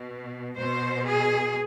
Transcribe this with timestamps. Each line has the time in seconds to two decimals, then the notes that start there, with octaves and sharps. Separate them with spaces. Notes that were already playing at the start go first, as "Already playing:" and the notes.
Already playing: B2
0.56 B2 C5
1.05 G#4